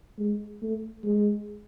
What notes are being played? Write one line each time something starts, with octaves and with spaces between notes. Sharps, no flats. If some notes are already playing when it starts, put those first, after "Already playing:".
G#3
A3
G#3